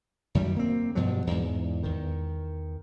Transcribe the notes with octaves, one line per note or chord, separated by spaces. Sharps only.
F#2 D#3 F#3 G3
A#3 C4
G2 B2 F3 F#3
E2 G#2
E2 D#3